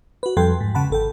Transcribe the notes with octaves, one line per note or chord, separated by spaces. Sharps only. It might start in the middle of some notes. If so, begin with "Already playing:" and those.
F#4 B4
F2 G3 A4 G5 C6
G#2
C#3 F#5 A5 B5
G#1 A4 G5